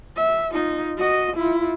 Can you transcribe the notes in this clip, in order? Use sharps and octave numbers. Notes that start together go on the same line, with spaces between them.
E5
D#4 F4
F#4 D#5
E4 F4